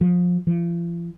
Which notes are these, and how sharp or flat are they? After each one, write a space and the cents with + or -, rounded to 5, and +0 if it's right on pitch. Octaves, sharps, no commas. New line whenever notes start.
F3 +25
F3 -40